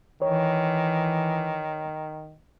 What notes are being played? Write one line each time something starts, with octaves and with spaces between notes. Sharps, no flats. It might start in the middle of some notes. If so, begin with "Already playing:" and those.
D#3 E3 C#5